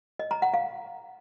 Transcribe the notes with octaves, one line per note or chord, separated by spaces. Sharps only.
D#5
A#5
F#5
F5